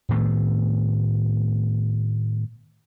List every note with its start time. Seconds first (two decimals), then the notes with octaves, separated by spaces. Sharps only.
0.09 A2 D#3 A3 B3